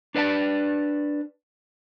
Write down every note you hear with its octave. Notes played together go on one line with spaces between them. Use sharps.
D4 B4 D5 E5 A5